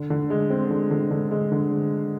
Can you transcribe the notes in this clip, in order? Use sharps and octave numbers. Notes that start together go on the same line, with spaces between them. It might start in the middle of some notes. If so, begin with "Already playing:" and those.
Already playing: D3
D3
G#3
C4
D3
D3
D3
G#3
D3